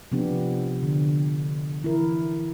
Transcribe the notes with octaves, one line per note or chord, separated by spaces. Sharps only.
C3 F3 B3 D4 G4
D3
E3 E4 A#4